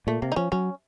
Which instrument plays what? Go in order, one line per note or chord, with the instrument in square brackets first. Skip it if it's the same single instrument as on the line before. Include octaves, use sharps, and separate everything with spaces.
[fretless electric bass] A#2 [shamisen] A3
[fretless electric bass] C3 [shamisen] A#3
[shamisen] D#4
[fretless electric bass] F3 [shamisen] C#4
[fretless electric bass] F#3 [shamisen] C#4